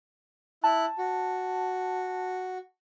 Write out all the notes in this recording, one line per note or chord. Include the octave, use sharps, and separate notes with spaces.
E4 A5 F#6
F#4